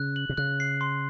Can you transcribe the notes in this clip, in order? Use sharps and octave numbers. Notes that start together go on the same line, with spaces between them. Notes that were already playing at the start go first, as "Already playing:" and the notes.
Already playing: C#3 F#6
F#7
C3
C#3 F#6
C7
C6